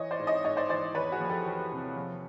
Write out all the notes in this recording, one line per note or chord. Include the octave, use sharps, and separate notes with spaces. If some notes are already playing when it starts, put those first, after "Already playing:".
Already playing: E3 C#5 D#5
C5 D5
G#2
C#5 D#5
G#2 C#5 D#5
C5 D5
E3 C5 D5
E2 B4 C#5
F#4 G#4
F3
G4 A4
E2 G4 A4
C3
F3